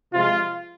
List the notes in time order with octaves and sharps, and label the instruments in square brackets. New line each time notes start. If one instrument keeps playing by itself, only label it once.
[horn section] C3 F3 G#3 F4